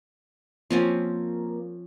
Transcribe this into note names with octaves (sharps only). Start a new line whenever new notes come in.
F3 A#3 C4 C#4